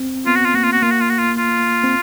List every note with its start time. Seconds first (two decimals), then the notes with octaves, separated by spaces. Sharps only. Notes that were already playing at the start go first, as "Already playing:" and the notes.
Already playing: C4
0.26 B3 F4
0.35 F#4
0.45 F4
0.54 A#3 F#4
0.63 F4
0.73 F#4
0.82 A#3 F4
0.91 F#4
1.00 F4
1.10 F#4
1.18 F4
1.38 F4
1.84 C4